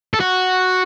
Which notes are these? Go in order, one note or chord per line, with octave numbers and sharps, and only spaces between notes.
A4
F#4